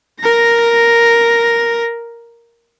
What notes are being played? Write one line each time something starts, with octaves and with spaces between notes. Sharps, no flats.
A#4 A#6